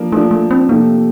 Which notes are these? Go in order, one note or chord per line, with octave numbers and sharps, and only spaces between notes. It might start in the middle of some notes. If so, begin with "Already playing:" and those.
Already playing: F3 A#3 D4
F3 A3 A#3 D4
A3
C4
C3 F3 A3 A#3 D4